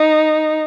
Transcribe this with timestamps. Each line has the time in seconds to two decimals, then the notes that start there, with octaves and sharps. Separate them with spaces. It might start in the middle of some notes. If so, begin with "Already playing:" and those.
Already playing: D#4